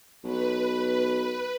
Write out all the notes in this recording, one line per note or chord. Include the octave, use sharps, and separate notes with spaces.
B1 B4